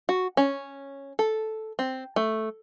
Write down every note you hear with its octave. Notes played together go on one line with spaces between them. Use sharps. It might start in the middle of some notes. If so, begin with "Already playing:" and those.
F#4
C#4
A4
C4
A3